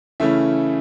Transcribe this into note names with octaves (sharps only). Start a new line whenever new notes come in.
C#3 E3 A3 C#4 E4 E5